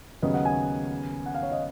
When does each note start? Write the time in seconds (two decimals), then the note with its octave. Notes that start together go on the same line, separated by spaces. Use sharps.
0.22 D#2 C#3 F#3 B3 D#5
0.34 F#5
0.45 G#5
1.26 F#5
1.35 F5
1.43 C#5
1.52 D#5